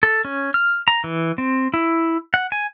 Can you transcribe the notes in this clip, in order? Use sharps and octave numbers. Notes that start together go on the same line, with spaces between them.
A4
C#4
F6
A#5
E3
C4
E4
F#5
G#5